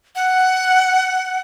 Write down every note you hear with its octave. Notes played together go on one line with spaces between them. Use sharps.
F#5